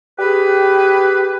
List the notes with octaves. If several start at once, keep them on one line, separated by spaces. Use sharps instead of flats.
G4 G#4 B4